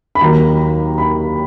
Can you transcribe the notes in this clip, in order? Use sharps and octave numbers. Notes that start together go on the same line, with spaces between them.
B5
D#2 D#3 F#3 A#3 A#5
B5